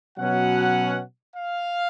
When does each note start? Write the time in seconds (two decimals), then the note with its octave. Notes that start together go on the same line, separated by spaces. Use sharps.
0.19 B2 F#3 C#4 F#5
1.36 F5